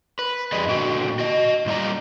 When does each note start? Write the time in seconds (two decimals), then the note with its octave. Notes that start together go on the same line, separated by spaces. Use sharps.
0.19 B4
0.52 F2 G#4 D5 D#5
0.68 A#2 D3 F#4 G5
1.19 F#4 D#5
1.66 A#2 G3 F4 D5 A#5